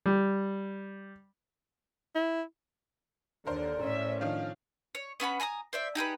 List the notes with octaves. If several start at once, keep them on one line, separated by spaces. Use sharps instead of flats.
G3
E4
D#2 D3 A#4 C5 D5
A2 C#4 E5
D#3 F3 D4 F5
C#5
B3 C#4 F#5 B5
G#5 A#5 B5 D#6
C5 D5 E5
D#4 G4 G#4 B4